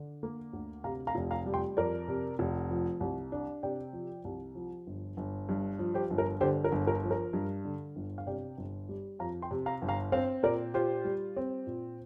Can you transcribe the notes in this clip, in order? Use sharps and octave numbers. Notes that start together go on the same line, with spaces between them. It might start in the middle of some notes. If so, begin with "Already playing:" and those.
Already playing: D3 D4
A#3
D2
C3 F5 A#5
F5 A#5
F1
F5 A#5
G3
G5 C6
F2 A#4 D5
C3
F1
F3
C2
D4
C3 D5 G5
F3
C2
F3
G1
G1
G2
F3
G4 C5
G1
A#4
D3 G4 C5
A#4
G1
A#4
F3
A#4
G2
D3
G1
F5
C3 D5 G5
G1
G3
F2 F5 A#5
G5 C6
C3
F5 A#5
G1
F5 A#5
C4 C5 F5
A#2 A#4 D5
F4 G4 C5
G3
C4
A#2